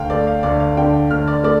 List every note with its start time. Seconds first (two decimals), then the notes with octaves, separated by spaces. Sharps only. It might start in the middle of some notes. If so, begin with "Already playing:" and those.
Already playing: D2 F5 G5
0.10 A3 D5
0.27 F5
0.43 D2 D5
0.60 F5
0.77 D3 G5
1.11 D2 F6
1.28 D5
1.44 A3 D5